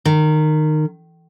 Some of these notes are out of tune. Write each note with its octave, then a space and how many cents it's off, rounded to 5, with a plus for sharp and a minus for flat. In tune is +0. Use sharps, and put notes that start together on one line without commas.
D#3 -20